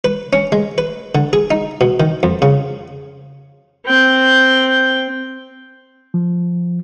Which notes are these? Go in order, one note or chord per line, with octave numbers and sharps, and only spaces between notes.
B4
C#4
G#3
B4
D3
G#4
D#4
B2
D#3
F2
C#3
C4 G5
F3